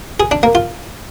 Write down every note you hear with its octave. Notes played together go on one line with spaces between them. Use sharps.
G#4
D4
A#3
F4